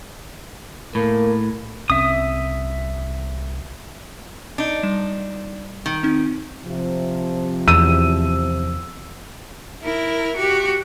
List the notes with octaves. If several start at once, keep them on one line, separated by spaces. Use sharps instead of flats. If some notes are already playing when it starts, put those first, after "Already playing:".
A2 A#3
C2 C4 C#4 E5 D#6
D4 D#4
G3 E7
D#3
C4 D#4
C3 F3
E2 E6 D#7
E4 A#4
F#4 G4